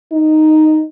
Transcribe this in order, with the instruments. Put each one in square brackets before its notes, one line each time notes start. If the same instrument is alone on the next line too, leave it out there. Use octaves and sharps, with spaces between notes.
[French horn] D#4